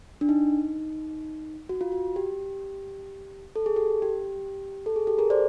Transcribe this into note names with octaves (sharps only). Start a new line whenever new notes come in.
D4
D#4
F#4
F4
F#4
G4
A4
G#4
G4 A4
G4
A4
G#4
G4 A4
G#4 A#4
C5 D5